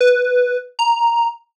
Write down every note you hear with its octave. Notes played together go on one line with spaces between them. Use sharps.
B4
A#5